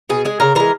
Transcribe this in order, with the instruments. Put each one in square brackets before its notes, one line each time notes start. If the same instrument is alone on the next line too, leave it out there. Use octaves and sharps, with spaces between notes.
[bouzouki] B2 G#4
G#3 G#4
C#3 A#4
E3 G#3 A#4